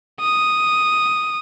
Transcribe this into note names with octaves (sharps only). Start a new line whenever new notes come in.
D#6